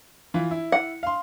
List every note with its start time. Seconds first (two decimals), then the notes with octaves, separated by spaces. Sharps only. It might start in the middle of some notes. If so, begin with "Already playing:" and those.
0.34 E3 F4
0.51 E4
0.72 F#5
1.03 F5 C6